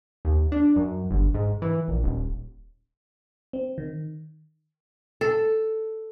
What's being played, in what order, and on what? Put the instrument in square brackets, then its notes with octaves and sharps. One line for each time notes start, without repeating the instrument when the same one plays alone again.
[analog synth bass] D#2
D4
F#2
G1
G#2
E3
A#1
D#1
[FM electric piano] C4
D#3
[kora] A4